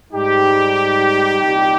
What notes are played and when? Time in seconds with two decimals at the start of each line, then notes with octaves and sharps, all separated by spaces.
0.13 G#2 G3 D#4 G4
1.43 C2 A#2 G3